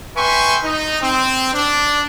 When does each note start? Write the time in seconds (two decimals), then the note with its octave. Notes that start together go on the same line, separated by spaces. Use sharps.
0.17 B4 E5 G5 G#5 C6 C#6
0.64 D#4
1.02 C4
1.53 D4